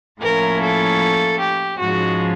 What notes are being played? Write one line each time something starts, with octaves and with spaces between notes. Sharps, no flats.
A2 F3 A#3 C#4 E4 A#4
A4
G4
G#2 F3 G#3 C#4 F#4